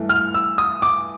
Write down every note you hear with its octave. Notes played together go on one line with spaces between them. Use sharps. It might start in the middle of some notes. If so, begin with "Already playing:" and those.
Already playing: G2 E3 A3
F6
E6
D#6
D6